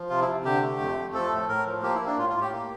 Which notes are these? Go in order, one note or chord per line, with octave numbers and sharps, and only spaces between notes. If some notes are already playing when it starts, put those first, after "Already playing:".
Already playing: F3
C3 F4
E4
C3
D3 G4
A3
F2
A3
F3 A4
A2
A2 A#4
F3
A#3 G4
E4
A#3
D4
A2 F4
F4
A2
G4
A#3